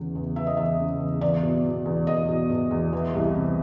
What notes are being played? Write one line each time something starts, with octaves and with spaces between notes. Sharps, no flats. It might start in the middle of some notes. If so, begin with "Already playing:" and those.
Already playing: E2 C#3 E3
E2
E3 E5
D#5
E2 E5
C#3
E2
E2 D5
B2
B2
E2
E2 D#5
B2
B2
E2
E3
C2
C3